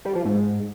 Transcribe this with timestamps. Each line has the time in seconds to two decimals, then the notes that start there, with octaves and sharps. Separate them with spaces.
0.05 G3
0.15 F3
0.25 G#2